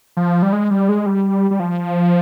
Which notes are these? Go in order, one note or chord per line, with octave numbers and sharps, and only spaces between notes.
F3
G3
G#3
G3
G#3
G3
G3
F3